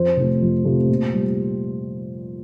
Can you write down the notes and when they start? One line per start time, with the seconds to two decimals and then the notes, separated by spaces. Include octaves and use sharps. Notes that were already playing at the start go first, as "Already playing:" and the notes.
Already playing: F2 C5
0.17 C3 F3 A3
0.42 F2
0.65 C3 F3 A3
0.89 A#2
1.14 G3